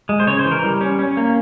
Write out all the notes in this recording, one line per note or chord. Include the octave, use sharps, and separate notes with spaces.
G#3
C5
C#3 C#5
C5
E3
A#4
G3
C#4
C#4
A#3